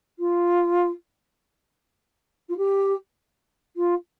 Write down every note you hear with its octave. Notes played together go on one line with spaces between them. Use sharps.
F4
F4
G4
F4